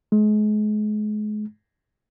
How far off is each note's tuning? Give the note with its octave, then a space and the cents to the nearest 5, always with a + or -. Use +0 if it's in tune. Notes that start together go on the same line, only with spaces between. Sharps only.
G#3 +35